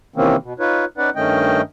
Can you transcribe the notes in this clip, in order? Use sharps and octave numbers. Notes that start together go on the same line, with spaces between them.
C3 D#3 E3 A#3 C4 C#4
B2
D#4 F4 B4 C#5
C#4 D#4 B4 D5 F#5
G2 D#3 A3 C#4 D#5 G5